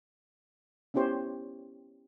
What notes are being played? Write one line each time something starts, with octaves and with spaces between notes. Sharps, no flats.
B3 C#4 E4 G4 C5 C#5